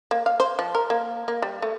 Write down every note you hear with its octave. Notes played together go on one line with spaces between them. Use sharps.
A#3
F5
C5
F3
A#4
A#3
A#3
G3
A3